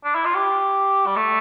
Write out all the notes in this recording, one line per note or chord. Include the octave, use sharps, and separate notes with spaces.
D4
E4
F4
G4
G3
A3